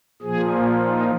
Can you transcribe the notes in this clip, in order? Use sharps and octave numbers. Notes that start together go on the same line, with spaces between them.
A#2 F3 G#4
D#4